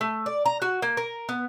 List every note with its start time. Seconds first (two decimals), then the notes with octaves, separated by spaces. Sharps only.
0.01 A3
0.26 D5
0.46 A#5
0.62 F#4
0.82 A#3
0.97 A#4
1.29 B3